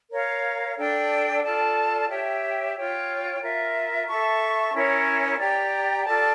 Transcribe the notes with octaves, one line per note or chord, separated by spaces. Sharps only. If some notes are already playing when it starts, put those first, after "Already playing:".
A#4 C#5 F5
D4 A4 D5 G5
F4 A4 D5 A5
G4 C#5 E5 G5
F4 C#5 G5
F4 A#4 E5
A4 E5 A5 C#6
C#4 E4 A#4 C#5
G4 D5 G5 A#5
F4 A4 D5 A5